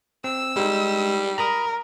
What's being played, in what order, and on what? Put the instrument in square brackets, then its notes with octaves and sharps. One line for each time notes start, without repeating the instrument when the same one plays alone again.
[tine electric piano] C4 [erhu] E6
[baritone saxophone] G3 [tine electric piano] G#3 D#4
[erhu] A#4 [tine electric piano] A#5 B5 D#6